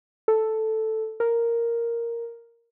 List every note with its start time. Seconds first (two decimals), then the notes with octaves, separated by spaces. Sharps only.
0.28 A4
1.20 A#4